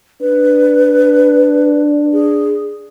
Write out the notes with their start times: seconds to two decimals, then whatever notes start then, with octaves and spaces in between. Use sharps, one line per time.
0.21 D4 B4
2.13 G#4